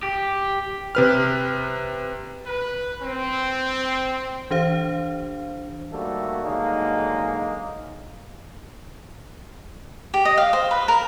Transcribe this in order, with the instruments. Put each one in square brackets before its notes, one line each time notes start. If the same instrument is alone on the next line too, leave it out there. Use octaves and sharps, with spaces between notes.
[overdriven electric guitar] G4
[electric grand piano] C3 B4 F6
[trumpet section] B4
C4
[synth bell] E3 D4 G4 C5 F5
[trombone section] D#3 G3 A3 A#3 F#4 A4
D3 F#3 G#3 A#3 D#4
[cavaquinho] G4
D#5
F5
C5
B4
A#4